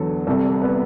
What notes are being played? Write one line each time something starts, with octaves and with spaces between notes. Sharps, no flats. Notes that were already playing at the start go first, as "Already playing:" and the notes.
Already playing: E2 D3 F#3 B3 A4
C2 C3 G3 A4
B3 B4